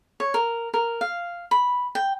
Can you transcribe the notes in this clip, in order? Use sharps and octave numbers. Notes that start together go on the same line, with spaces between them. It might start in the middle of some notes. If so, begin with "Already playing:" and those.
C#5
A#4
A#4
F5
B5
G5